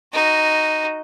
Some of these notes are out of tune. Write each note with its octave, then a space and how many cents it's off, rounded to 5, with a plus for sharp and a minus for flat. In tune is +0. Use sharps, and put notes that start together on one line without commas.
D#4 +0 F#4 +5